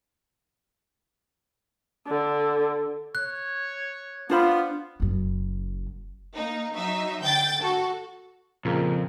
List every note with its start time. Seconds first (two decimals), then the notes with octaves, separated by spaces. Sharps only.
2.07 D3
3.15 C#5 F#6
4.30 B3 D4 F4 C5 B5
5.00 F#1 F#2
6.33 A#3 D#4
6.72 F#3 D#4 E5
7.23 D3 G5 G6 A6
7.60 F#4 A4
8.65 F2 A#2 C#3 A#4